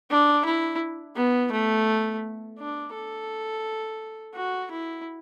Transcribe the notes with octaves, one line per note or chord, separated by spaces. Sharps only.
D4
E4
B3
A3
D4
A4
F#4
E4